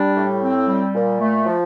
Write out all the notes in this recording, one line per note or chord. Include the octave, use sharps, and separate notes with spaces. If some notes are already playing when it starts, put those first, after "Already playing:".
Already playing: G3 D4
A2
C4
G3
A#2
A3
F3